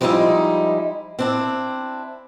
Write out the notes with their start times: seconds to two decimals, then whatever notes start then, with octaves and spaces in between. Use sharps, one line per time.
0.01 F3 G3 G#3 B3 D#4 E4
1.19 C4 D4 E4